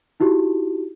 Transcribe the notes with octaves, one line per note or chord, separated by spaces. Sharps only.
D#4 E4 F#4 G4